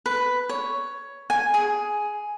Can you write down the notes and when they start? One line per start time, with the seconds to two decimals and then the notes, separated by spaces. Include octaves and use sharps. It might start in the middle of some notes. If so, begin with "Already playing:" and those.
0.06 B4
0.49 C#5
1.30 G#5
1.54 G#4